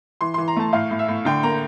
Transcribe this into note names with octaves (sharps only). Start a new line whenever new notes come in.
E3 C6
E3 C6
A#5
A3 A5
A2 F5
A2
E5
A2
D3 G5
A#3 A#5